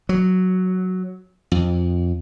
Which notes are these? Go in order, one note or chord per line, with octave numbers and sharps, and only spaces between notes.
F#3
F2